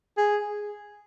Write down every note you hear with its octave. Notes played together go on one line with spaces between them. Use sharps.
G#4